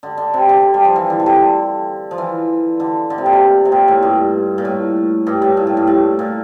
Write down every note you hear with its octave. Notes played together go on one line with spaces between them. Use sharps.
D3
D3
C3
D3
G3
F3
E3
D3
C3
D3
F3
E3
D3
D3
C3
A#2
C3
C3
A#2
A2
G2
A#2
A2
G2
A2
A#2
A2
G2
A2
A#2